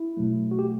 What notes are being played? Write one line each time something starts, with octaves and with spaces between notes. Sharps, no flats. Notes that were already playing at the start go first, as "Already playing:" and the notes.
Already playing: E4
B2 F#3 A3
F#4
G4